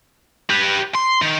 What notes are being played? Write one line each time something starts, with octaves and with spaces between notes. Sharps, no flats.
G4 B4
C6
D#3